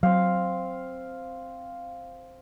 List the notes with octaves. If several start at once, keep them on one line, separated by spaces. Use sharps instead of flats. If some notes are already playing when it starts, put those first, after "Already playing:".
F#3 C4 F5